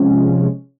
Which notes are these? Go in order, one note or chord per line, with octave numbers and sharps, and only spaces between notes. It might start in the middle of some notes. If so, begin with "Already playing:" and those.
Already playing: C3 F3 G#3 C#4